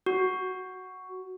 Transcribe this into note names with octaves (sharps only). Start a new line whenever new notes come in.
F#4